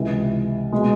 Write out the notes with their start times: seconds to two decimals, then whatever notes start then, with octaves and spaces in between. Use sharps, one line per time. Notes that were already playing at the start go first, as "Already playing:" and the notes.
Already playing: C#2 C3 E3
0.72 B2 G#3